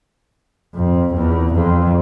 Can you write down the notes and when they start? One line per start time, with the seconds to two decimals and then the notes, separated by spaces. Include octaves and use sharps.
0.75 F2
1.15 E2
1.54 F2